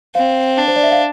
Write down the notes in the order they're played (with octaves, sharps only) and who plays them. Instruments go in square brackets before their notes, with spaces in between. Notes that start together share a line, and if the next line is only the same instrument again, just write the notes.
[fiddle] C4 [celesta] F5
[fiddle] D4
[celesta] C5
D5
E5
F5